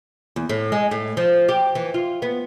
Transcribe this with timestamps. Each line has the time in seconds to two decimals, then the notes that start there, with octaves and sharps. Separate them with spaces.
0.36 E2
0.49 A2
0.72 G#3
0.91 A2
1.17 F3
1.48 G4
1.75 E3
1.94 F4
2.22 B3